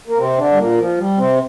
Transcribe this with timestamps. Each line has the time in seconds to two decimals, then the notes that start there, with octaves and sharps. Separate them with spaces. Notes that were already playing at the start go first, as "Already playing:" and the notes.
0.07 A#3
0.18 C3 C4
0.38 D3 D4
0.52 G3
0.58 A#2 A#3
0.78 F3
0.98 G3
1.18 C3 C4